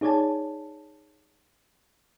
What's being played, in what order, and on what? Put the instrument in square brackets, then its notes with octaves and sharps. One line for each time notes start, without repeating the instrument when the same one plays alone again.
[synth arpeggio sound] D#4 G#4 C#5 D5 G#5 A5